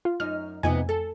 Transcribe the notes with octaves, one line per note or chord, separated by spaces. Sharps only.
F4
F#2 D#4 F6
F2 C3 B3 D#4 G#5
A4